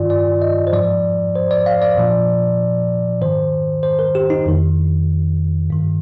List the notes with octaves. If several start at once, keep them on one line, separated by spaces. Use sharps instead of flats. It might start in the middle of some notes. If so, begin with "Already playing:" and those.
Already playing: G2 D#3 F4 D5
D5
D#5
C5
G#2 F3 D5
C5
D5
F5
D5
A#2 F3
G#2 D#3 C5
C5
A#4
G4
D#4
F2 D#3
G2 D#3